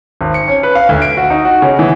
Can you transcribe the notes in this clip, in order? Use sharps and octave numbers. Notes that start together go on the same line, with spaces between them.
G#1
C#7
C#4
B4
F5
D2
D7
F#4
D#4
F#4
C#3
E3